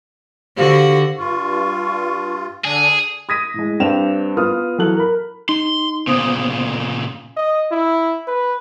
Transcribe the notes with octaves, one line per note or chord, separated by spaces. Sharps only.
D3 F#4 G4 C5 F5
G2 F4 C#6
D3 D4 G#4
D#6 G#6 A#6 B6 D#7
A2 G#3
G2 C4 D4 G5 E7 F7
B3 F4 D#6 F6
E3 F#3 A4 F#6 F#7
A#4 B5
D#4 C6
A#2 C#3 B3 C5 D#6
D#5
E4
B4